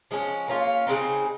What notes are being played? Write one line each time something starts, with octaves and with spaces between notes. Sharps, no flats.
F3 G#3 C#4
A#3 C#4 F4
C#3 G#3 C4 D#4